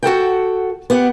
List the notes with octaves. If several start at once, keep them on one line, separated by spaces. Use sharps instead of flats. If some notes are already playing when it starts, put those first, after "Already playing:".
F#4 A4 F#5 G5
B3 G4 F#5